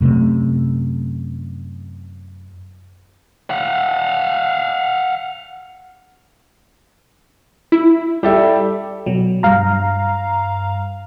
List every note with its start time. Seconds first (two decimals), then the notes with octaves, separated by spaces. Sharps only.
0.01 F#2 C3 A3
3.50 F5 F#5
7.72 E4
8.23 G3 G4 A4 E5
9.06 B2 F#3
9.43 G2 F5 A#5